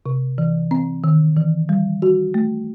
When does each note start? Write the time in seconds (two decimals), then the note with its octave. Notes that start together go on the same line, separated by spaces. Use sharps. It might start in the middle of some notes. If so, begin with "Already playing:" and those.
0.06 C3
0.38 E3
0.71 C4
1.04 D#3
1.36 E3
1.69 G3
2.02 F#4
2.34 A3